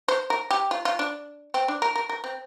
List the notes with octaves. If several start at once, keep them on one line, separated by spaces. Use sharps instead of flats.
C5
A#4
G4
F4
F4
D4
C4
D4
A#4
A#4
A#4
C4